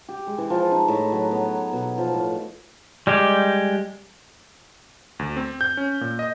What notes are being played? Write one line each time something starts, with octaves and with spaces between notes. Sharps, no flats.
G4
G#3
E3
F3
D#4
A2
F#3
B3
B2
F3
A2
G3 G#3 G4
D2
C4
G6
C#4
A#2
D#5